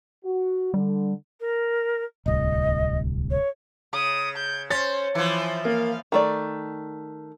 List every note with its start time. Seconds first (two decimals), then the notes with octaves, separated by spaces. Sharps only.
0.24 F#4
0.74 D3 G3
1.40 A#4
2.26 D1 C2 D#5
3.30 C#5
3.93 C#3 D#6
4.37 G6
4.70 C#4 C5 A6
5.15 E3 F3 C5
5.65 A#3 F5
6.12 D#3 A3 D5